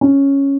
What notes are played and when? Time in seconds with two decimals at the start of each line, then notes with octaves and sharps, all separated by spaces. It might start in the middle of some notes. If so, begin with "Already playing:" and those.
0.01 C#4